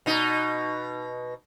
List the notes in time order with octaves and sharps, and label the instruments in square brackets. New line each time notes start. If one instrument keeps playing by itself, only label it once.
[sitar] B2 D#4